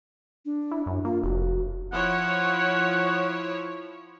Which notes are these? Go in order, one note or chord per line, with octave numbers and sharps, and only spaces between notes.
D4
E4
F#2
A#3 F4
F1 F#4
F3 E4 C#5 F#5